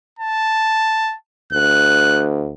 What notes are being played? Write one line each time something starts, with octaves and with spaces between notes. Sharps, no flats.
A5
D2 F#6